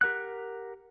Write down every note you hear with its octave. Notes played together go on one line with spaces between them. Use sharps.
G4 A#4 F#5 F#6